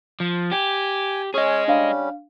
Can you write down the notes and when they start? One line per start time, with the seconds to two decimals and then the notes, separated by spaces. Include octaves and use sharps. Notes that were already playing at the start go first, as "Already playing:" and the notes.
0.20 F3
0.52 G4 G#5
1.34 C#4 G#4 C#5 D#5
1.68 G3 C#4 D4 F5